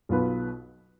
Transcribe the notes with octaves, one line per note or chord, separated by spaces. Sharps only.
B1 B2 B3 F4 B4